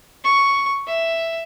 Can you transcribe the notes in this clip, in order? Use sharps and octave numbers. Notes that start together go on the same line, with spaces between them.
C#6
E5